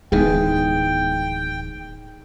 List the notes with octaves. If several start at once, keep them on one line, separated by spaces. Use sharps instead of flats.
D1 E3 G#3 B3 D#4 G#4 G5